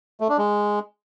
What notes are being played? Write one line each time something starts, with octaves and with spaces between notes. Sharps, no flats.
A3
D4
G#3